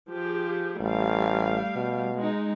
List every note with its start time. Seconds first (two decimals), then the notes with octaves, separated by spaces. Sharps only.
0.11 F3 G4 G#4
0.80 A1 G3 A3 F5
1.76 B2
2.15 G#3 D#4